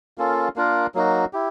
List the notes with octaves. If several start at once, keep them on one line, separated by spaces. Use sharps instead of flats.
A#3 C#4 F4 A4
A#3 D4 F4 A#4
F#3 A#3 D#4 F#4
E4 G4